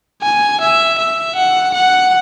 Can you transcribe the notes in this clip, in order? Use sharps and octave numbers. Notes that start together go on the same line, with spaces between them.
G#5
E5
E5
F#5
F#5